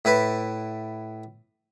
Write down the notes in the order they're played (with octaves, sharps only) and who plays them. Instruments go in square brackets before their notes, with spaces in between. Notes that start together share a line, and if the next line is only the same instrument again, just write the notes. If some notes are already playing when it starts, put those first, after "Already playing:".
[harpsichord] A2 E4 B4 A5 B5